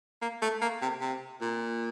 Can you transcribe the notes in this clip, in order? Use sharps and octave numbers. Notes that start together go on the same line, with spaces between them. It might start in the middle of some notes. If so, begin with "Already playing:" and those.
A#3
A3
A#3
C3
C3
A#2